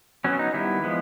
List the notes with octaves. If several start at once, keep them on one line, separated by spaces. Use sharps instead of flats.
F#3 B3 C#4
D#4
D#3 G3 B3 E4
F3 G#3 B3